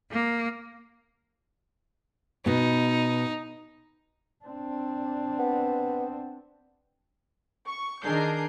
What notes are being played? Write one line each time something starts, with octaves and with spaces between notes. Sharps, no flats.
A#3
B2 B3 D#4
C4 D4
B3
C#6
D#3 D4 G#4 A#4 G6 C7